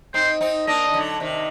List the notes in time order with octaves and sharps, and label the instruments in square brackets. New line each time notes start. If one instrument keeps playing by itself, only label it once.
[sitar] C4 D#4 [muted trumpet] C5
[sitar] C4 D#4
[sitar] A#3 D4 [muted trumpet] D#5
[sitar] D#3
D3 F#3
C3 D#3